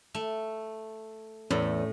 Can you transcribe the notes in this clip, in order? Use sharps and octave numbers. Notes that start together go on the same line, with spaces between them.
A3
E2 A2 A3 C#4